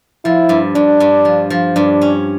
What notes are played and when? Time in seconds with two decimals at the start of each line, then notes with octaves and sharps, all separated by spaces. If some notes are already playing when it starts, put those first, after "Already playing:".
0.25 F3 E4
0.49 G2
0.75 G2 D4
1.00 G2
1.25 F3
1.50 F3
1.76 G2 D4
2.01 C#4